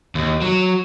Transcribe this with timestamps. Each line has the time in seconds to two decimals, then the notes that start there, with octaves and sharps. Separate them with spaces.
0.15 D#2
0.42 F#3